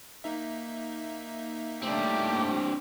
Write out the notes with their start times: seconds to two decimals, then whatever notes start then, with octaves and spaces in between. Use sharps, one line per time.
0.24 A#3 D#4 E5
1.83 A3 C4 D4 G4